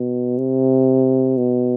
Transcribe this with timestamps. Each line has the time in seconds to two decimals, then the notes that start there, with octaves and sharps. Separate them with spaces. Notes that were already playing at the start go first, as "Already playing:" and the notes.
Already playing: B2
0.38 C3
1.37 B2